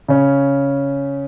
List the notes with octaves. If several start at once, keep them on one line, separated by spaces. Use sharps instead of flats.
C#3 C#4